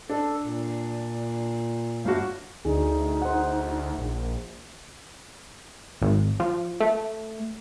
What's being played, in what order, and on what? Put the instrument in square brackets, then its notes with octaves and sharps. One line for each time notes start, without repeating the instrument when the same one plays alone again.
[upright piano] D4 [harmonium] A4
[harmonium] A#2
[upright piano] G1 F#4 [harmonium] D4 F5
[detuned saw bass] D2 [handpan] D4 G#4 [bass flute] D#4
[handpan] C5 F#5
[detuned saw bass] A#1
[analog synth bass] G#1
F3
A3